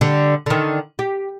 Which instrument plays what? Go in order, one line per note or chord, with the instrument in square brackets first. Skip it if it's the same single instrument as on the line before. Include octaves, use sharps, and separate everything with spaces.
[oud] D3 G3
D3 D#3
G4